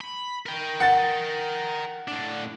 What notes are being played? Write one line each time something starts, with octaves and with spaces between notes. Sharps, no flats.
B5
A#4 G5
F#5 A6
A2 D4